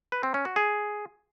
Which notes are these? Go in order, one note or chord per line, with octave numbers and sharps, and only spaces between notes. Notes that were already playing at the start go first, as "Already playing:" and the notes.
B4
C4
C#4
F#4
G#4